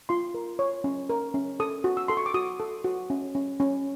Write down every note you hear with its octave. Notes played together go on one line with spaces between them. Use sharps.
F4 C6
A#4
C#5
C#4
A#4
C#4
A4 D#6
F#4
E6
A4 C6
C#6
D6
F#4 D#6
A4
F#4
C#4
C#4
C#4